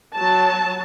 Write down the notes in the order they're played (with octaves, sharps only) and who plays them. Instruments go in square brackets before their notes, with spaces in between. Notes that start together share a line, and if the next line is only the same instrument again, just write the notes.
[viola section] F#3 A5